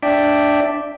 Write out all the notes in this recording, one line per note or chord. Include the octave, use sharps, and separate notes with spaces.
D4 D5 E5 G5